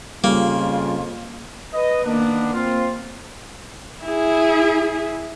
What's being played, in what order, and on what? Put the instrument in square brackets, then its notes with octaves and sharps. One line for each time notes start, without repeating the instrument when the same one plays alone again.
[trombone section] F2 F4 [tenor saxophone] C#3 [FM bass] G3 [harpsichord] A#3
[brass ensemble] B4 D#5
[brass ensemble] D#3 B3 D4 [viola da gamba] A#3
[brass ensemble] C4 F4
[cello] E4 G#4